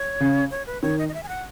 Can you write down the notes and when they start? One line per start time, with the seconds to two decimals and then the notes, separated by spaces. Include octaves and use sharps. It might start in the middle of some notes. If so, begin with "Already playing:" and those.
Already playing: C#5
0.20 C#3
0.51 C#5
0.66 B4
0.82 D#3 C#5
0.98 D#5
1.09 D#5
1.14 E5
1.23 G#5
1.28 F#5